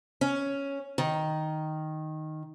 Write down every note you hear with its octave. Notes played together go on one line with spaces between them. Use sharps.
C#4
D#3